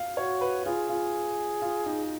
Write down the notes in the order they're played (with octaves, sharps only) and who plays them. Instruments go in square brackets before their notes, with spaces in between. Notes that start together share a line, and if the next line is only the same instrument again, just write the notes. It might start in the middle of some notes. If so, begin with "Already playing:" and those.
Already playing: [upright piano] F5
[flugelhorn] F#4 [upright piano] C#5
[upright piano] B4
[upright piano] F4 [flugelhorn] G#4
[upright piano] F4
F4
D#4